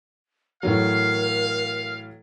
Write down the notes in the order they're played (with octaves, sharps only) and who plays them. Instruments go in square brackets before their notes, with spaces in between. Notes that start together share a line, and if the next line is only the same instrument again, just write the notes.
[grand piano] A2 E3 F#3 [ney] A#4 [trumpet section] F5